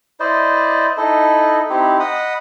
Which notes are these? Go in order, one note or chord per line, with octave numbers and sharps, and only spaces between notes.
E4 C5 D5 D#5
D#4 E4 A4 D#5
C4 D#4 E4 G4
D#5 F#5 B5 D#6